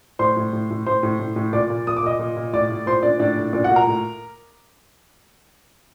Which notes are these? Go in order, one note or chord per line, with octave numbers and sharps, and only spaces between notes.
A2 C5 C6
A2
A2
A2
A2 C5 C6
A2
A2
A2
A#2 D5 D6
A#2
A#2 D#6
D6
A#2 D#5 D#6
A#2
A#2
A2 D5 D6
A2
A#2 C5 C6
A#2 D4 D5
A2 D4 D5
A2
A#2 D4 D5
F#4 F#5
A#2
A#4 A#5
A2